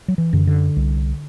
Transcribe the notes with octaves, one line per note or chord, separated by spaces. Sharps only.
F#3
E3
F#2 D3
D3
C2